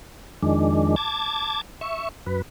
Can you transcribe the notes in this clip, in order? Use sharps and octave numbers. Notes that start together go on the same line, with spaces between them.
F2 D#3 G#3 D4
A5 D6 G#6 A6
E5 C#6
F#2 B4